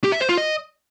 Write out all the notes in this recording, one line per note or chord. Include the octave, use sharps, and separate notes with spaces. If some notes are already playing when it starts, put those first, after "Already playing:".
G4
E5
C5
F4
D#5